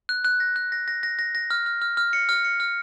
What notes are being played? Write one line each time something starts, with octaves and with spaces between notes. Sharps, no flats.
F#6
F#6
A#6
F#6
A#6
A#6
A#6
A#6
A#6
F6
F6
F6
F6
C#7
F6
C#7
F6